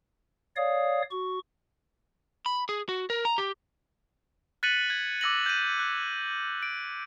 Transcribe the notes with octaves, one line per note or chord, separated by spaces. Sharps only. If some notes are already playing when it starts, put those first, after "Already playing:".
C#5 D5 F5 D#6
F#4 C#6
B5
G#4
F#4
A#4
A#5
G4
F#6 A6 B6 C#7 D#7 F#7
G#6
D6 E6 A#6 F#7
G6 D#7
F#6
D7